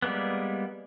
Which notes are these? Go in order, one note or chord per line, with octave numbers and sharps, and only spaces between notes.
G3 G#3 A#3 B3